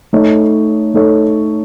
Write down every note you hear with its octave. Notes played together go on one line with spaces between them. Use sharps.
A3 D#4 A4 C#5
A3 D#4 A4 C#5